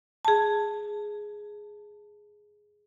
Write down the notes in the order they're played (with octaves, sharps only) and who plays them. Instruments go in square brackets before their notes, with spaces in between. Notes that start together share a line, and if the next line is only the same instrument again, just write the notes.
[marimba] G#4 A5